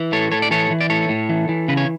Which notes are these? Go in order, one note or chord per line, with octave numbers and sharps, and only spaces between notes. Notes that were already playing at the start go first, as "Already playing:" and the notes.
Already playing: E3
A2 A4 C#5
A2 A4 C#5
D5
E3 A4 C#5
E3
D5
A2 A4 C#5
A2
E3
E3
C#3 B4
C#5